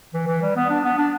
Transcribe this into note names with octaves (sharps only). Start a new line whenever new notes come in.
E3
E3
G3
B3
D4
B3
D4